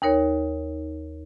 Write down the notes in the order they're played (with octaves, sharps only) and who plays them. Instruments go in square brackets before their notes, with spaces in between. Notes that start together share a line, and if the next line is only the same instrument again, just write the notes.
[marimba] D#2 D#4 A#4 C#5